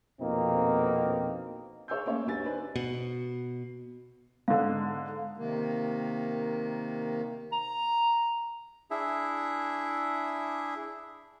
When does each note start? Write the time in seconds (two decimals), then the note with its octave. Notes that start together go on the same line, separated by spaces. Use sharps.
0.20 A#1 F2 B2 A#3 C4 D#4
1.88 G#4 C#5 F5 G#5 E6 G6
2.05 A3 A#3 C#4 C#5
2.27 D2 G3 B3 G#5 A6
2.44 D4 D#4 B4 C5
2.76 B2
4.48 G#2 D3 F5
5.37 C3 D#3 A#3
7.52 A#5
8.91 D4 E4 G#4 E5